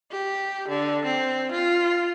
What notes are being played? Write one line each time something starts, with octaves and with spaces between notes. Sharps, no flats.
G4
D3
C4
F4